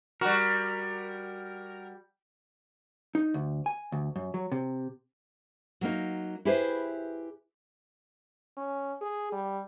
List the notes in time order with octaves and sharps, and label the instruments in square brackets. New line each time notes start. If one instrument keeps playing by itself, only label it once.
[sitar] G3 F#4 [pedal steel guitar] A#4
[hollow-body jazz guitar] D#4
D2
G#5
D2
F#2
F#3
C3
[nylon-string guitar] F#3 A#3 D#4
E4 G4 G#4 B4 C5
[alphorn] C#4
G#4
G3